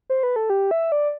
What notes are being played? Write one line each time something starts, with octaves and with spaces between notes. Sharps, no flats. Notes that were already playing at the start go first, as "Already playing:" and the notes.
C5
B4
A4
G4
E5
D5